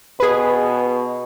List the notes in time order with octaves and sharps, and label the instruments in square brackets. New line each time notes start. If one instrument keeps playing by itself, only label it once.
[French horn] B2 [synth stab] G#4 B4